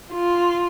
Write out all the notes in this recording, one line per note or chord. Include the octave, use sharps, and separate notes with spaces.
F4